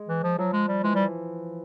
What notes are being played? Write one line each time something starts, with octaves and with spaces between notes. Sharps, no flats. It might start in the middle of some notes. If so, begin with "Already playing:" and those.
Already playing: G#3
E3
F3
F3 F#3
G#3
G3
E3 G#3
G3